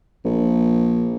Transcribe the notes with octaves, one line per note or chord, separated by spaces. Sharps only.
A#1